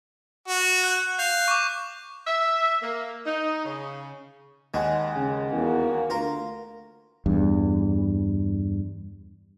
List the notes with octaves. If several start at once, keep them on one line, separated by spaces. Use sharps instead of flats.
F#4
F#6
F5 G6
C#6 D6
E5
A#3
D#4
C#3
D#2 G#3 F#5 G#5
C#3
E2 A#3 F#4
D2 F4 A#4
E2 G2